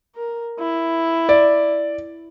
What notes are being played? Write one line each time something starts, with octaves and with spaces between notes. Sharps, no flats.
A#4
E4
D5